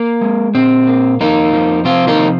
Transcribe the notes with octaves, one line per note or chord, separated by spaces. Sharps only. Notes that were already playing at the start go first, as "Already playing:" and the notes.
Already playing: A#3
G#3
A#2 C4
A#3
F2 A#3 D#4
F3
C3 C4 F4
A#3 D#4
F3